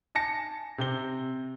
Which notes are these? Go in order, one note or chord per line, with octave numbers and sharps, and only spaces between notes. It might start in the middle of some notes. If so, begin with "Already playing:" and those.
G#5 A5 A#6 C#7
C3 C4 G7